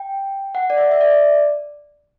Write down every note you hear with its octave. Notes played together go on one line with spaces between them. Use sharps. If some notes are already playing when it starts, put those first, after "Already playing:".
Already playing: G5
F#5
D5
E5
E5
D5